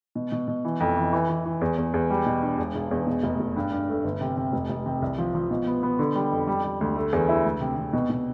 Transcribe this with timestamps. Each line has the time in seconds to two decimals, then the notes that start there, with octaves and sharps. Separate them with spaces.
0.15 B2
0.32 B2
0.48 B2
0.65 E3
0.80 F2
0.96 E3
1.13 E3
1.29 E3
1.45 E3
1.61 E2
1.78 E2
1.94 E2
2.10 G3
2.26 B2
2.43 D4
2.58 E1
2.75 E1
2.91 E2
3.07 B2
3.23 F1
3.40 F1
3.56 G2
3.72 G2
3.89 A3
4.04 G1
4.21 C3
4.37 C3
4.53 F1
4.70 F1
4.86 C3
5.02 C2
5.18 F3
5.35 F3
5.51 B2
5.67 B3
5.83 B3
5.99 D3
6.15 G3
6.31 F2
6.47 G3
6.64 G3
6.81 D2
6.96 A3
7.13 E2
7.29 E4
7.45 D2
7.61 C3
7.77 C3
7.93 B2
8.10 B2